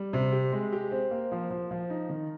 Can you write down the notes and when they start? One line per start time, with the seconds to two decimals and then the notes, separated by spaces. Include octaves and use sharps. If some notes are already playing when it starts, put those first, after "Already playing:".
Already playing: G3
0.13 C3
0.32 G4
0.52 G#3
0.73 G4
0.91 C4
1.11 A#3
1.32 F3
1.50 F3
1.71 F3
1.90 D#4
2.09 D#3